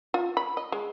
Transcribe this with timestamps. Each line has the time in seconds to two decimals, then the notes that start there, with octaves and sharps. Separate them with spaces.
0.14 F4
0.37 B5
0.57 D#5
0.72 G#3